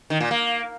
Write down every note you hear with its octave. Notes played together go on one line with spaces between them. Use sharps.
D#3
A#2
A#3